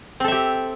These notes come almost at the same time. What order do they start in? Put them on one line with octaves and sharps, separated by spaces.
C4 A4 E5 G4